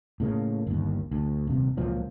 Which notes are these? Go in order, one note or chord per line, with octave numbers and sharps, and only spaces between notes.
A2 C#3 A#3
G1 D#2
D2
D#1 C3
C#2 A#2 F3 F#3